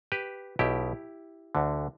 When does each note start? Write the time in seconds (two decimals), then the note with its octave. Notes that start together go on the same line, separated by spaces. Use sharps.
0.12 G4 B4
0.59 B1 B2 E4 G4
1.55 D2 D3